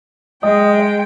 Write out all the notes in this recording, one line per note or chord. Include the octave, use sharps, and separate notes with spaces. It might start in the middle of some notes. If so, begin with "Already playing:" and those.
G#3 D#5 G5